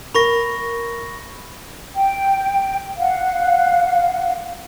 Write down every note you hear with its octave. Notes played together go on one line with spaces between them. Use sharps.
A#4 B5 C#6 A#6
G5
F5 F#5